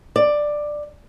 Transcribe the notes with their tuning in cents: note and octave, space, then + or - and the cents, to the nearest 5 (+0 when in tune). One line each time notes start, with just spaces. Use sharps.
D5 +10